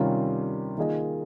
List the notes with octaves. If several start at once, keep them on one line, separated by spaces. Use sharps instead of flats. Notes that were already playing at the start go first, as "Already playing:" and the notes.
Already playing: C3 D#3 G3 C#4 F4
D#3 A#3 F4 G#4 D#5